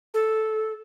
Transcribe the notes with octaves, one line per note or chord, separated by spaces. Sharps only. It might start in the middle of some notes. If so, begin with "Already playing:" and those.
A4